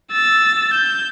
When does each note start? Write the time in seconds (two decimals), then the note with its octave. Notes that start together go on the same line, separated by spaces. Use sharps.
0.12 E6 A6
0.74 G6